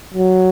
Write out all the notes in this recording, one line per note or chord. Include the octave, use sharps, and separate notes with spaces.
F#3